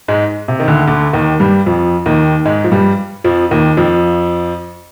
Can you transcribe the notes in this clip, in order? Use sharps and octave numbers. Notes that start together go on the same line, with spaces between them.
G#2 G#3
C3
D#3
D2 D3
D2 D3
D#2 D#3
G2 G3
F2 F3
D#2 D#3
G#2 G#3
F3
G2 G3
F2 F3
D#2 D#3
F2 F3